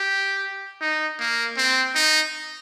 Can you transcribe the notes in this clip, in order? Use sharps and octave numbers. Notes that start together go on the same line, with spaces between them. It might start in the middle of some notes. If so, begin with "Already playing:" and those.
Already playing: G4
D#4
A#3
C4
D#4